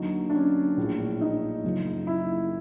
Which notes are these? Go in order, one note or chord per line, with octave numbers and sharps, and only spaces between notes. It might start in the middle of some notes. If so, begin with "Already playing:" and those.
Already playing: D#2 D3 F#3 D#4
D4
C#4
A#1 A2 F3
D#4
F#1 F#2 C#3 F3
E4